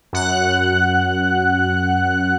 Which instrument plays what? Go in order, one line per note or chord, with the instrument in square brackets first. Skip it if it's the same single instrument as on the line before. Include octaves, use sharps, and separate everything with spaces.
[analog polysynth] F#2 F#5 F#6